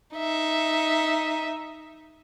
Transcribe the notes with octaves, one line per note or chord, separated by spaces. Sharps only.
D#4 E5